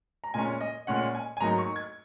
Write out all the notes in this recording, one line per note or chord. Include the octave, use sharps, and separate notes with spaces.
A#5
A#2 G#3 C#4 G#5
D#5
A#2 G#3 C#4 F#5
G#5
G#5
G#2 F#3 A#3 D#4 A#5
C#6
G#6